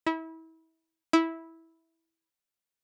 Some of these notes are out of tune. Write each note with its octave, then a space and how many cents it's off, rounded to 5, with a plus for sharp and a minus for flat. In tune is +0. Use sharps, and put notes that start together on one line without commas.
E4 -30
E4 -10